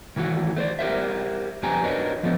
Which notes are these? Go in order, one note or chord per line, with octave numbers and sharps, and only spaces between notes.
D#3 E3 A3 F#4
A3 C5 D5
G4 A#4 C5 E5
F2 B3 G4 G#5 A#5
D4 F#4 A#4 B4 C#5 D#5
F3 A3 B3